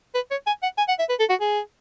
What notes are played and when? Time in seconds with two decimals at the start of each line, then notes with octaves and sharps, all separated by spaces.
0.15 B4
0.31 C#5
0.47 G#5
0.63 F#5
0.78 G#5
0.88 F#5
0.99 E5
1.09 B4
1.20 A4
1.30 F#4
1.41 G#4